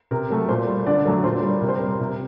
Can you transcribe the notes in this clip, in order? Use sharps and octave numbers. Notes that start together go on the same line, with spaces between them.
C3 A#4
F#3 A3
A#2 C5
G3
D3 D5
F#3 A3
A#2 C5
G3
C3 A#4
C5
G3 A#4
C3